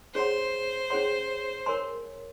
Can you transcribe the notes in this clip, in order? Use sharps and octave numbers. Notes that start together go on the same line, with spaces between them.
C#4 G#4 C5 C#5 F#5 C6
C#4 G#4 C#5 F#5 C6
A#4 C#5 G#5 C6